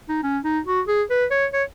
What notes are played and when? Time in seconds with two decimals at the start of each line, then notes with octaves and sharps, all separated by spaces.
0.09 D#4
0.23 C#4
0.44 D#4
0.66 F#4
0.88 G#4
1.10 B4
1.31 C#5
1.53 C#5